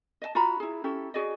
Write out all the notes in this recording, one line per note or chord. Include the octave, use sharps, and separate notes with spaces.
D#5 E5 A5
F4 F#4 A#5 B5
E4 G#4
C#4 E4 G4 A4
F#4 G#4 D5 D#5